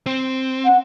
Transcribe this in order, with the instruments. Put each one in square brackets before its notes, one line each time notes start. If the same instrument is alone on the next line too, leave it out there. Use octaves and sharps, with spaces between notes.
[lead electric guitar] C4
[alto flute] F#5